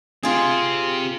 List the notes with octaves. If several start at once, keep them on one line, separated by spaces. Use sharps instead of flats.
C4 F4 G4 G#4